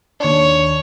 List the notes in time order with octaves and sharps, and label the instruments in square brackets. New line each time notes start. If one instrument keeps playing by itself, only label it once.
[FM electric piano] D#2 D4 [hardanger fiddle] C#5